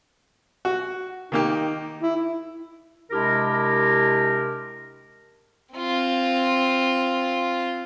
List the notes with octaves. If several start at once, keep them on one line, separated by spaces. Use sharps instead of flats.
F#4
D#3 A#3 D#4 G4
E4
C3 G#3 D4 E4 G4 A#4
C4 F4